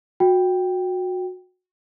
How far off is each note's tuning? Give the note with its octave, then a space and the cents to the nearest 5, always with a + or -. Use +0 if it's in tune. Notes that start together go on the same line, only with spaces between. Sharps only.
F#4 -20 G5 +0